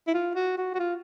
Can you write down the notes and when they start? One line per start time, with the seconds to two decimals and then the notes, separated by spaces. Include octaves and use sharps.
0.08 E4
0.14 F4
0.35 F#4
0.58 F#4
0.74 F#4
0.80 F4